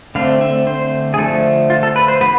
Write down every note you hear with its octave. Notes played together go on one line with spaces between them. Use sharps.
D3 A3 C4 F5
E5
C5
G#4
D3 F3 A3 A4
F4
A4
B4
C5
B3 B4